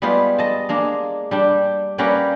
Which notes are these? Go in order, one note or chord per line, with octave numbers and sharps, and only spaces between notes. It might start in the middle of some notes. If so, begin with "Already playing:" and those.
G3 G#3 B3 F4 B4 C5
D#5 A5
G#3 A#3 D4
G3 D4 G5
G3 A#3 C#4 B4 F#5 G5